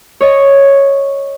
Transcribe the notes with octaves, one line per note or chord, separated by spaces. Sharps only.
C#5 D#5